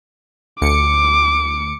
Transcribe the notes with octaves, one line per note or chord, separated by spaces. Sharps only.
D2 D6 C#7